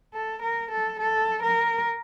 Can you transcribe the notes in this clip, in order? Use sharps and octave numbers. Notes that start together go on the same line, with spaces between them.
A4
A#4
A4
A4
A#4